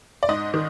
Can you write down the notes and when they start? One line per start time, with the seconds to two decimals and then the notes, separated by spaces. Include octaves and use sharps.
0.23 D5
0.29 G#2 D#5
0.54 D#3